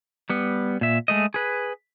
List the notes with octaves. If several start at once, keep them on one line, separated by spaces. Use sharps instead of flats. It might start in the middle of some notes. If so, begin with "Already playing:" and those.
G3 B3
A#2 E5
G#3 A3 D#5
G#4 B4